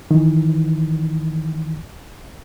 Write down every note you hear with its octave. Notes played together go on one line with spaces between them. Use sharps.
D#3 E3